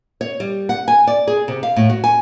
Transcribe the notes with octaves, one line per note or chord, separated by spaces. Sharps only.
C#5
G3
F#5
G#5
D5
G#4
C3
F5
A2
F#4
G#5